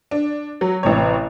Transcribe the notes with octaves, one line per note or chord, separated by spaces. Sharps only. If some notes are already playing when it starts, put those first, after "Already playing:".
D4
F#3
A1 C3 C#5